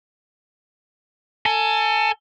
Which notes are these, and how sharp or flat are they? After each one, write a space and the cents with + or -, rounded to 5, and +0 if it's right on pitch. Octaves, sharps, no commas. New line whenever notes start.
A4 +25 G#5 +20